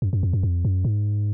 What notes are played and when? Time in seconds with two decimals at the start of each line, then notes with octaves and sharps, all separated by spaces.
0.02 F#2
0.13 F#2
0.23 F2
0.33 F#2
0.43 F2
0.65 F#2
0.85 G#2